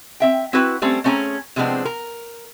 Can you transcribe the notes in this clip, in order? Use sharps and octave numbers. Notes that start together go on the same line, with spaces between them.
C4 E5 G5
C4 E4 F#4 B4
G3 A3 C4 C#4
A3 C4 C#4 G#4 A#5
C3 F3 G#3 B3 C4 D4
A#4